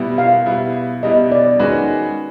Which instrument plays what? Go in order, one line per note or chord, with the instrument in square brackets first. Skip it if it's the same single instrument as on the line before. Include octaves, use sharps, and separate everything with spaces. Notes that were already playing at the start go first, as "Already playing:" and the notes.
Already playing: [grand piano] B2 G3 B3 E4
[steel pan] F5
[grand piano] B2 G3 B3 E4
[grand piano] B2 G3 B3 E4 [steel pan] D#5
[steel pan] D5
[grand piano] D#3 G#3 C#4 F#4 B4